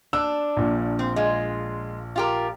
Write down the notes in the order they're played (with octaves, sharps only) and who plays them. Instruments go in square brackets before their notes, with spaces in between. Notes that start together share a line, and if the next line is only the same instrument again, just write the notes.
[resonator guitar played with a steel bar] D4 [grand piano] E6
[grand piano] A#1 A#2
[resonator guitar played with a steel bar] C4
G#3 F4
F4 G4 A#4